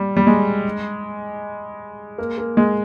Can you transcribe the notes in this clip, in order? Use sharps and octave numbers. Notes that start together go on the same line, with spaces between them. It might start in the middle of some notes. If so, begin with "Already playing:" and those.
Already playing: G3
G3
G#3
A#3
A#3
G#3